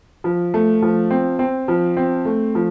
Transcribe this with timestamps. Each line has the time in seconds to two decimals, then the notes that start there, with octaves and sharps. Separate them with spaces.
0.24 F3
0.54 A3
0.82 F3
1.11 C4
1.39 C4
1.68 F3
1.97 C4
2.25 A3
2.55 F3